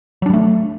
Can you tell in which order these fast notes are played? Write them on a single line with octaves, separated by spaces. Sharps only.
F#3 D4 G3 A3